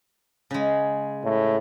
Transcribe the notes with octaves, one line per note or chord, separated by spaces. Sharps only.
C#3 G#3
A2